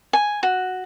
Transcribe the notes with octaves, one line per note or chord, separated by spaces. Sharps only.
G#5
F#4